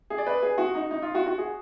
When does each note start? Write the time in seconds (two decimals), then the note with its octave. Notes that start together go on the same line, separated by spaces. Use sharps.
0.10 G#4
0.18 D5
0.26 B4
0.42 G#4
0.58 F#4
0.75 D#4
0.91 D#4
1.02 F4
1.15 F#4
1.26 F#4
1.38 G#4